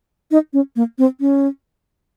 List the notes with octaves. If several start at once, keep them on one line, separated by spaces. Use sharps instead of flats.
D#4
C#4
A#3
C4
C#4